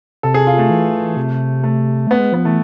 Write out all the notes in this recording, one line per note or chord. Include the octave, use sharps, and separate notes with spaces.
C3 A4
G#4
F4
A3
E3
C3
A3
A3 B3
G#3
F3 B3
E3 A3